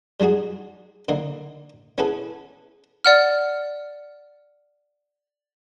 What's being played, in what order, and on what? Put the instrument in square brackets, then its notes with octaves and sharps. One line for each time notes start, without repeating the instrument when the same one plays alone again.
[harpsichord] G3 G#3 D#4 F#4 G#4
D3 A#3 D#4
B3 C#4 E4 G#4 A4 B4
[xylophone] D5 F#5 F6